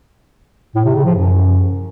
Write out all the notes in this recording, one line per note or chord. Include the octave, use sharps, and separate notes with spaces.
A2
C3
C#3
F3
F#2